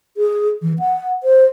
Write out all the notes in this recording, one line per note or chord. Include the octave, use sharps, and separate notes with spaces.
G#4
E3
F#5
C5